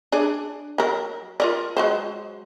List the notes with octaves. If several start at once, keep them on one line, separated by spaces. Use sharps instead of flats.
D4 G#4 D5
F#3 A#4
F4 A#4 D5
F#3 G#3 C5